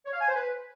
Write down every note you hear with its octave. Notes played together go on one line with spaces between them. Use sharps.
C#5
F5
G#5
C5
B4